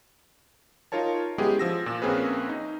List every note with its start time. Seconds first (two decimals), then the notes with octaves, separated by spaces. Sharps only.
0.92 D#4 F4 A#4 C#5 A5
1.38 G#3 B3 C#4 E4 G4 G#4
1.59 F3 E6 A#6
1.86 A#2 E7
2.02 A#1 A#3 C4 C#4 G#4 B4
2.49 D#4